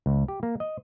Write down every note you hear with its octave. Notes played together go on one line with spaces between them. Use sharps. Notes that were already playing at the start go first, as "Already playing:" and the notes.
C#2
G4
A#3
D#5